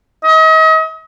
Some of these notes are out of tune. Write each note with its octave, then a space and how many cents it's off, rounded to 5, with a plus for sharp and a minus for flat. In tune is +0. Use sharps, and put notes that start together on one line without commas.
D#5 +40